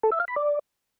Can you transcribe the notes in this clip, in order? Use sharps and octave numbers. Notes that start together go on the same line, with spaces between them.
A4
E5
F5
B5
D5